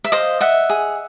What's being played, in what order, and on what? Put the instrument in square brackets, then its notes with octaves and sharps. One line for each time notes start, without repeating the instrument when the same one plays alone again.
[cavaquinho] E5
C5 D#5 F5
D#5 E5 F#5
G#4